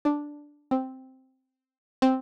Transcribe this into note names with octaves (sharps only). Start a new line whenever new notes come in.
D4
C4
C4